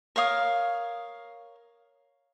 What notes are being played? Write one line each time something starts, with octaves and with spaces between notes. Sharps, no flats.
A#4 C#5 F5 D#6